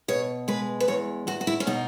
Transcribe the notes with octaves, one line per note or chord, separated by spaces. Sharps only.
B2 C#5
G#3 B4
B4
E2 C#5
E2 F#4
F#4
E4
C#4
B2 D#4